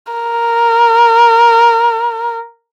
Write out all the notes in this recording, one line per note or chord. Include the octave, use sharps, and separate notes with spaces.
A#4